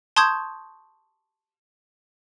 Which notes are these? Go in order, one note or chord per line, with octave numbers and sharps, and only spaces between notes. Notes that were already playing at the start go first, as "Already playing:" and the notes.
A5 C6 C#6 D#6 G6 G#6